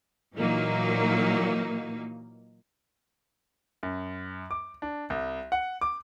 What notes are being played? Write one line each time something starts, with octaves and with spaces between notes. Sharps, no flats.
A#2 E3 F#3 A#3 D#4
F#2
D6
D4
C2
F#5
D6